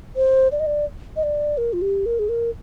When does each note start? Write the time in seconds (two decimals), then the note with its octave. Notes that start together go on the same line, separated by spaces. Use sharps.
0.16 C5
0.52 D5
0.60 D#5
0.66 D5
1.16 D#5
1.23 D5
1.58 A#4
1.73 F4
1.82 G4
2.06 A#4
2.19 G#4
2.29 A#4